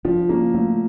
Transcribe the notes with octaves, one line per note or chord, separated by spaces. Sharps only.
F3 D4
A#3 C#4
F3 A3